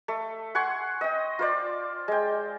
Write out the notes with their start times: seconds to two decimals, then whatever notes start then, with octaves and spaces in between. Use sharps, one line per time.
0.08 A3
0.55 F#5 G#5 C6 C#6
1.01 D#5 G5
1.39 F4 C5 D5
2.08 G#3 G5